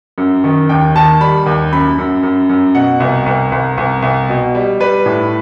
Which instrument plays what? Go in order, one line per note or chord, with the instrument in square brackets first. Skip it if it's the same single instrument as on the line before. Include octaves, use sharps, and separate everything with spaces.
[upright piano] F#2
D#3
D#2 G5
D#3 A5
G3 B5
D#2
F#2 B5
F#2
F#2
F#2
B2 F#5
C2
C2
C2
C2
C2
B2
G3
G3 B4
A2